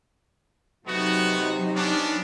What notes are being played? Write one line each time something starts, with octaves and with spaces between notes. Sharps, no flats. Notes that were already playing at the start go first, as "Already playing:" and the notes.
C3 F#3 A3 B3 D#4 F#4
B3 C#4 D4